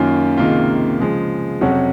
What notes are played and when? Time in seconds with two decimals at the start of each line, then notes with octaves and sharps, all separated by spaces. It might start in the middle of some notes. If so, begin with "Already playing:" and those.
Already playing: F#2 D#3 A#3 C#4 F4
0.37 C#2 C3 D#3 A#3 F4
1.00 C#3 F3 G#3
1.61 F2 C3 F#3 C#4 F#4